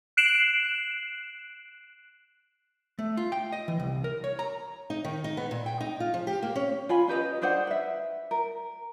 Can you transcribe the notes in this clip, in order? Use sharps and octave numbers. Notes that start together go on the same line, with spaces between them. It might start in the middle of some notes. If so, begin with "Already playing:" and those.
F#6 C7 D7 E7 F#7
A3
F4
G5
D#5
E3
C2
A#4
C#5
A#5
D#4
D#3
D#4
B3
A#2
G5
D#4
F4
F3
G4
A#3
C#4
F4 G#5 B5
C#4 G4 B4 D#5
D4 G#4 C5 F#5
B4 E5
A#4